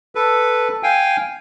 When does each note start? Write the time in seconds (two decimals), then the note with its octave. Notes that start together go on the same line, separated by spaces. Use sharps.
0.15 A4 B4
0.83 F5 G5 G#5